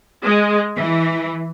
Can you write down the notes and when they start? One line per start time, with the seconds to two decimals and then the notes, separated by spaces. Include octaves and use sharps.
0.22 G#3
0.76 E3